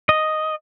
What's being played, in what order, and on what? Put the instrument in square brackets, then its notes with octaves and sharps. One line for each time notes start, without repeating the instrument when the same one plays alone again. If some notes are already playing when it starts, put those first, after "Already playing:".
[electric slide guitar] D#5